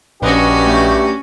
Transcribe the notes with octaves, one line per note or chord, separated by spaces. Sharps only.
A#1 G2 C#4 F#4 G4 B4 D#5
A3